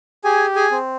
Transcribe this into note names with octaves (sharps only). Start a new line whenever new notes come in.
G4 G#4 G#5
G#4 G#5
C4